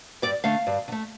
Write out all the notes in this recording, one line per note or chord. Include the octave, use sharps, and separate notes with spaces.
G2 D5
D3 A3 F5
G2
D3
A3